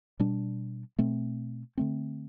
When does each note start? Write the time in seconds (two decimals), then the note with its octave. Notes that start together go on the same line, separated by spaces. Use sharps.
0.20 B2 G3 D4
0.99 B2 A3 C4
1.78 D3 A3 C4